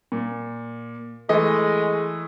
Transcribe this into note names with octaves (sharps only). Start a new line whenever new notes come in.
A#2
E3 G#3 A3 D#5